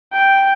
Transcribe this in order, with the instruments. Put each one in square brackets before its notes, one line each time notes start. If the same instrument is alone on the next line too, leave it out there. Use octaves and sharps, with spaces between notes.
[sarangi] G5